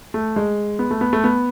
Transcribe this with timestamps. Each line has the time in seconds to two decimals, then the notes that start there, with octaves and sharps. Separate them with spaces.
0.14 A3
0.36 G#3
0.79 B3
0.91 A3
1.01 B3
1.13 A3
1.24 B3